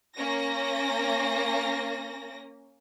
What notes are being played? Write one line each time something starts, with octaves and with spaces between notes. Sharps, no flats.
A#3 C#4 A#6